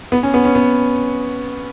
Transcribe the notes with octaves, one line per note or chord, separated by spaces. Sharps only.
B3
C#4
B3
C#4
B3